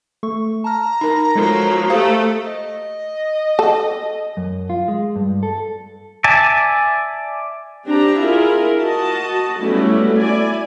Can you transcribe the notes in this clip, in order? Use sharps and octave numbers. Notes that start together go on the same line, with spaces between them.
A3 A4 C#6
A5 A#5 F6
D#4 A#4
F3 F#3 G#3 A4
A3 G4 A4 C5 F5 D#6
D#5
A4
F#2
F4
G#3
G2
A4
D5 E5 G#5 A5
C4 D4 G4 A#5
E4 F4 G#4 A#4
F#4 D#5 A5
F#3 G3 A3 B3 C#4 E4
E4 D5 G#5